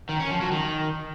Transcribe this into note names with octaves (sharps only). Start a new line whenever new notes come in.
D#3
C#4
F3
F#3
D#3